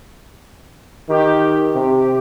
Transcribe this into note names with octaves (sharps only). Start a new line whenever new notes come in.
D#3 G4
C3